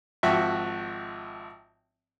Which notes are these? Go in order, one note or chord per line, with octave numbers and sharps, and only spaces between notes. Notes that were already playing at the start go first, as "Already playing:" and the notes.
G#1 F3 F#4 E5 G5 C#6